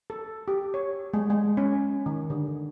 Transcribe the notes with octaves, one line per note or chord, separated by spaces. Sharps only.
A4
G4
C#5
G#3
G#3
C#4
D#3
D3